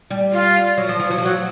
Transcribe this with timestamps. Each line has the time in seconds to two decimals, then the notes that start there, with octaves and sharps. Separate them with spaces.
0.11 G3
0.33 F4
0.78 F#3
0.89 F3
1.00 F3
1.11 F#3
1.18 F3
1.22 F#4
1.26 F#3